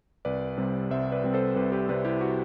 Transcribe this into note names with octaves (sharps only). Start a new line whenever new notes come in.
C2 B4 D5
C3 G3 C4
C2 C5 E5
B4 D5
C3 G3 C4
A4 C5
C2 G4 B4
G4 B4
C3 G3 C4 B4 D5
E4 G4
F#4